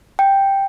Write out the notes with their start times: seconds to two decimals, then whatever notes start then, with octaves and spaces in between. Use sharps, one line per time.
0.19 G5